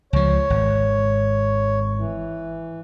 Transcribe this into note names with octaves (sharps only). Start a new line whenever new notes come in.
C#2 F3 C#5
G#1
E3